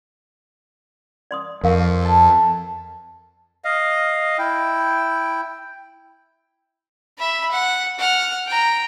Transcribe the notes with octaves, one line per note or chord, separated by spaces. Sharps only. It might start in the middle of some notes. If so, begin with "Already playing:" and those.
D5 C6 D#6
F2 A#4 F5 C#6
A4 A5
D#5 F5
E4 G5
E5 B5
F#5
F#5 F6
G5 A#5